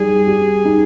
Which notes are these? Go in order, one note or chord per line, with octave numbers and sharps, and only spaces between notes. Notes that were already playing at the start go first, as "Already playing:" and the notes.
Already playing: G3 D#4 G#4
G4
D#4